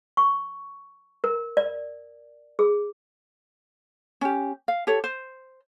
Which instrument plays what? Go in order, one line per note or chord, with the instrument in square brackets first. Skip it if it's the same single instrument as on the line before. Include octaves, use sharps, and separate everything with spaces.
[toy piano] C#6
A#4
D5
G#4
[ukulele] C#4 G4
F5
G4 A4 C#5
C5